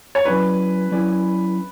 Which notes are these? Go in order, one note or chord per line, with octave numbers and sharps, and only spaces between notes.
C#5
F#3 C#4 E4 G#4 B4 D5
F#3 C#4 E4 G#4 D5